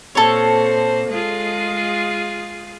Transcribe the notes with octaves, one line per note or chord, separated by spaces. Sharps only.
A#2 C4 A4 C5 C#5
G#3 F4 G#4